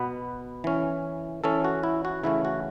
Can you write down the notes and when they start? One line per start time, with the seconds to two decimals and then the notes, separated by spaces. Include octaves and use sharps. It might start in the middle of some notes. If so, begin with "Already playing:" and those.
Already playing: B2 B3 B4
0.64 E3 C#4
1.44 E3 C#4 A4
1.65 F#4
1.83 E4
2.05 F#4
2.24 C#3 E3 A3 C#4 E4
2.45 F#4